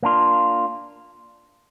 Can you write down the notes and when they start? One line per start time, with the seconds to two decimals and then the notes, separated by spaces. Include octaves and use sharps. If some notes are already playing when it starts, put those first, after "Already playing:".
0.03 A#3 D4 F4